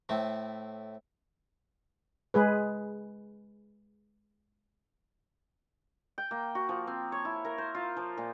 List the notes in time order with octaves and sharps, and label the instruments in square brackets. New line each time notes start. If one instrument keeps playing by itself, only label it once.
[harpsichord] A2 A3 C4
[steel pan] G#3 G#4 B4
[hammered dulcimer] G5
A#3
F#4
F3
C4
C#5
E4
A#4
C5
F4
F3
A#2